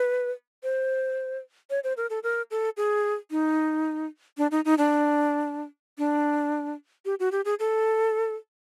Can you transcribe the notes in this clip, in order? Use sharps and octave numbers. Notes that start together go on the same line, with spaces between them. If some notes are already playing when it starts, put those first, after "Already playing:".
Already playing: B4
C5
C#5
C5
A#4
A4
A#4
A4
G#4
D#4
D4
D#4
D#4
D4
D4
G4
F#4
G4
G#4
A4